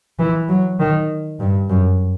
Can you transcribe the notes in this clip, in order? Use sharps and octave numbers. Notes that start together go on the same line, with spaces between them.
E3
F#3
D#3
G2
F#2